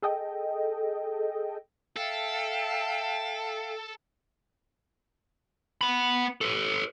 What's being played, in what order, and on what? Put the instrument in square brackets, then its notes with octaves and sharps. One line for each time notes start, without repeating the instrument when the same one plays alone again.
[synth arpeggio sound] G#4 A4 D#5 G5
[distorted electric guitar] A4 [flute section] E5 F5 G5
[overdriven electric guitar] B3 B5
A4 B4